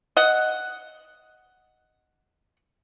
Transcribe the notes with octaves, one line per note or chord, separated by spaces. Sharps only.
D#5 F#5